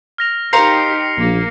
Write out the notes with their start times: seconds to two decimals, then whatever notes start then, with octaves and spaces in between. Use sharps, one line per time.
0.18 F6 A#6 F7
0.53 D#4 G4 A#4 C5 F5 C7 C#7 F7
1.18 A#1 A#3 C7